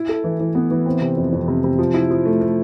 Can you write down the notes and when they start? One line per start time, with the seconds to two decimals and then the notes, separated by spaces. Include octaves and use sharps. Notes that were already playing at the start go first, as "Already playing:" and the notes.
Already playing: E4
0.09 A4
0.24 E3
0.40 E3
0.55 B3
0.71 E3
0.86 C4
1.02 C3
1.17 F2
1.33 F2
1.48 C3
1.64 C3
1.79 F3
1.94 E4
2.10 F3
2.25 A3
2.41 A3